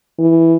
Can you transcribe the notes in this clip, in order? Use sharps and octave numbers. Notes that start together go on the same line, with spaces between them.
E3